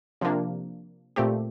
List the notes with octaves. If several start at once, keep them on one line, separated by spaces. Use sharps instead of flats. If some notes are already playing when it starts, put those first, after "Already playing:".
C3 F3 A#3 D4
A#2 A3 C4 G4